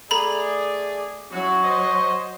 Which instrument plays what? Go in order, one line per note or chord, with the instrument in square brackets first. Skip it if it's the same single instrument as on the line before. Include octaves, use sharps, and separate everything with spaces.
[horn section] A3 G#4 [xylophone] A4 A#5 B5 [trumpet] D5
[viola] F#3 [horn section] C#4 E4 F#4 [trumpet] C#6
[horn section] C5 D#5